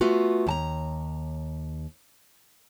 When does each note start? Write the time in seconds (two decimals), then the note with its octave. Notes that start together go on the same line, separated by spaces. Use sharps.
0.01 A3 B3 F4 F#4
0.47 D#2 A5 A#5